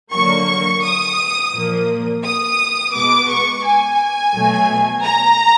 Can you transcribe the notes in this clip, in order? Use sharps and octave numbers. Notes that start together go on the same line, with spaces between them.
D3 F#3 A#3 C#6
D#6
A#2 F3 A#3
D#6
B2 G#3 B3 D6
C#6
G#5
B2 F#3 A3
A#5